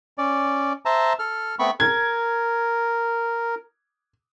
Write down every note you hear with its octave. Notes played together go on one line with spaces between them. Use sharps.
C#4 D5
C5 E5 A5 A#5
A4 F6
A3 B3 C4 B5 C#6
A#4 G#6